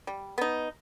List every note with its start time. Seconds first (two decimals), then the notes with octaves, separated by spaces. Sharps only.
0.07 G3
0.38 B3 D#4